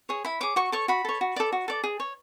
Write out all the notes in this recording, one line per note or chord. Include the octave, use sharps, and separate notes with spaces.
G#4 C#5
E4 B5
G#4 C#5 D6
F#4 C#6
A4 C#5 C#6
F#4 B5
A4 C#5
F#4
A4 D5
F#4
A4 D5
G#4
C#5